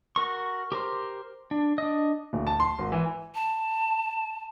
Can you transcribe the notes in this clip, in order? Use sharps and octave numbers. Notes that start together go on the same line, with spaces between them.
F#4 A#4 C#6
G4 A#4 C5
D4
D4 D#5
D1
A5
C6
G#1
E3
A5